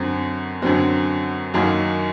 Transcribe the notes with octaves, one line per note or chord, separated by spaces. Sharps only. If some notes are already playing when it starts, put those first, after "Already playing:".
Already playing: F#2 D3 F#3 C4 F#4
F#2 D3 F#3 C4 F#4
F#2 D#3 F#3 A#3 F#4